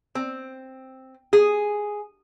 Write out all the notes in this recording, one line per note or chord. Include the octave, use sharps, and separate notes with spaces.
C4
G#4